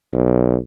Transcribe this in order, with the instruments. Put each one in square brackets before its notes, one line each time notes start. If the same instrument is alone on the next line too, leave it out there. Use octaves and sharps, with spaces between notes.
[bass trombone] B1